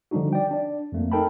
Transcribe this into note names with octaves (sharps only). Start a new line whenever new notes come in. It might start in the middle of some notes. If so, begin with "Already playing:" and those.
D3 F3 G3 D4 D#4 F#4
D5 G5
D4 D5
F2 A3 A#3
D#4 A4 A#4 G5 A5 B5